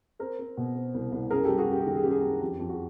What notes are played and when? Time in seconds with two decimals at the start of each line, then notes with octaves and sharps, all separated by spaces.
0.19 C4 A#4 C5
0.39 C4
0.57 B2
0.75 C4
0.94 C2
1.12 C2
1.30 F#2 G#4 A#4
1.45 G3 G4 A4
1.58 F#4 G#4
1.67 F#2 G4
1.80 G#4
1.86 D#3 G4
1.96 G#4
2.03 F#2 G4
2.11 G#4
2.19 F#2 G4
2.41 F2 G4
2.59 F2
2.69 F#4 G#4